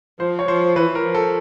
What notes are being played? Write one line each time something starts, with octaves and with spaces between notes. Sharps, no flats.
F3 C5
C#5
F3 C5
E3 B4
A#4
F3
A4